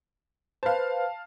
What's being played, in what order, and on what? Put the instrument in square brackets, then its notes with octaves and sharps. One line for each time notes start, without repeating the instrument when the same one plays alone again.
[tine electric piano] B4 C5 [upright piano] F5 A5